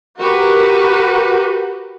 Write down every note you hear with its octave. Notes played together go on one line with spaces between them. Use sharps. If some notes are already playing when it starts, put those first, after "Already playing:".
F#4 G4 A#4 B4